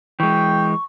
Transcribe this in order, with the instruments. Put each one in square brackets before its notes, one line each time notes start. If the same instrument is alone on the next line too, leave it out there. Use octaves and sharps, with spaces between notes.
[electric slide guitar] E3 G#3 [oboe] G5 [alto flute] C#6